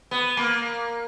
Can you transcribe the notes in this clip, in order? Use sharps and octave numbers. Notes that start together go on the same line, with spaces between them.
B3
A#3